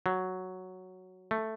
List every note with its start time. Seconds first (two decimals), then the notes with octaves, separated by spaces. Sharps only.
0.06 F#3
1.31 A3